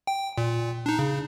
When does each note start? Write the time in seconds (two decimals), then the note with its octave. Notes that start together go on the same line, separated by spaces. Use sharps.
0.07 G5
0.38 A#2
0.86 D4 D#4
0.99 C#3